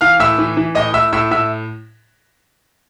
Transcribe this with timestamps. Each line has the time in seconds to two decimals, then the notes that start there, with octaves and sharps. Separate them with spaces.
0.01 E3 F5 F6
0.20 A2 E5 E6
0.39 E3
0.57 E3
0.75 A2 D#5 D#6
0.94 A2 E5 E6
1.13 A2 E5 E6
1.31 A2 E5 E6